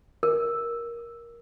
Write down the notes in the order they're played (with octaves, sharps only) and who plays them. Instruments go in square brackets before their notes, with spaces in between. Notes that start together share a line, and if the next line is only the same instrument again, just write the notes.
[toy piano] A#4